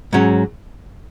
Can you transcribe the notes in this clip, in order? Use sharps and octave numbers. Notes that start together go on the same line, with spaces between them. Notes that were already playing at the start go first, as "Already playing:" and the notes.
G#2 F#3 C#4